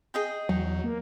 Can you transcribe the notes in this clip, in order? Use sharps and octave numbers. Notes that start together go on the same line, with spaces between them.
G#4 D#5 G5
E2 F#3 D#4
A#3